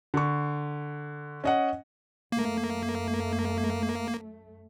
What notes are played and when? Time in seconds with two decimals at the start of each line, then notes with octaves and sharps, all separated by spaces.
0.14 D3 C#6
1.44 C#4 D#5 F#5
2.32 F#2 A3 A#3